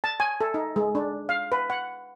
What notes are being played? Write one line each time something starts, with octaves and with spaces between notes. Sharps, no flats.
A5
G#5
A4
D#4
G#3
D4
F5
B4
F#5